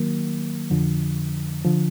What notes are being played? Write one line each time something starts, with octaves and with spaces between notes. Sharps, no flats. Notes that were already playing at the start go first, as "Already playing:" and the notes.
Already playing: D#3 F#3 A#3
F2 D3 F3
D3 F3